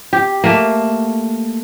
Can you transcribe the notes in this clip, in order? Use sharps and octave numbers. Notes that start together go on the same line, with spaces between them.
G4
A3 A#3